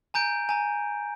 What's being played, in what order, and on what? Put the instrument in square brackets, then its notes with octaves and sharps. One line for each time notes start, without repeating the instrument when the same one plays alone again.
[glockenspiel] G#5 A#5 G6 D7
G#5 A#5